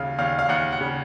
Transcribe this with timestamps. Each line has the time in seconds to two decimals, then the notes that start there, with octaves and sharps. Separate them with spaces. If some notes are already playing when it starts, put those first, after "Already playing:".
Already playing: D#2 C#3 F5
0.19 D#2 F5
0.39 F5
0.49 D#2 F#5
0.72 F#5
0.81 C#3